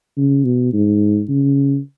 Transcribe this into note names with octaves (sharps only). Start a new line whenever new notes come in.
C#3
B2
G#2
C#3